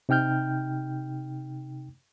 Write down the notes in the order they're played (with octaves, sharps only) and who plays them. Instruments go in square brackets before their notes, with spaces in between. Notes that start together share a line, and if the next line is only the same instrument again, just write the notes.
[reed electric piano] C3 D#4 G5 F6 G6